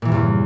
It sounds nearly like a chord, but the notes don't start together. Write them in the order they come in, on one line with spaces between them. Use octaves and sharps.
A#2 E3 G2 E2 C#3